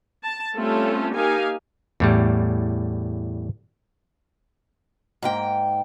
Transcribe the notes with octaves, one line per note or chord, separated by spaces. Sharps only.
A5
G3 A3 C4 C#4 F4 A4
A#3 D#4 G4 F5 G#5
E2 A2 G3
G#2 A#3 G5